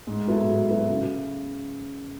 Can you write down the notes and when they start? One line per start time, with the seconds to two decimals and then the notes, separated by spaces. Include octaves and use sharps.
0.07 G#2
0.27 F#3 B3 E4 A4
0.48 G#2
0.69 F#3 B3 E4 A4
0.89 C#3